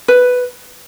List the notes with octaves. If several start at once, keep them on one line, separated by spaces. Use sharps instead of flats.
B4